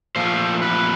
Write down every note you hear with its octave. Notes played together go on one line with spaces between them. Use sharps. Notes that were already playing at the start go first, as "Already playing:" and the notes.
A#2 F3 A3 C5
B4